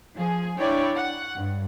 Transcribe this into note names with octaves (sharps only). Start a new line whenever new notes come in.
F3 G#4
D4 E4 C#5 D5 G5
F#5
G2